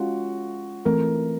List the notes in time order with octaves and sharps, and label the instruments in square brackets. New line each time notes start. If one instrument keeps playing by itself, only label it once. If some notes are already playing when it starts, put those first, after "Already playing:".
Already playing: [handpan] G#3 C#4 F4 [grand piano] F#4
[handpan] E3 A3 C4 [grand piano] A#4